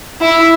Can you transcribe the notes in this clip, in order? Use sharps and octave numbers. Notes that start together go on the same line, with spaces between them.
E4